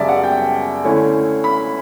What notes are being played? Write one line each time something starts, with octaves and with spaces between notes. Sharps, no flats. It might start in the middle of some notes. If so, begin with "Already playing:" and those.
Already playing: F#2 C#3 G3 D5 E5 A5
F#5
G5
D3 A3 C#4 E4
B5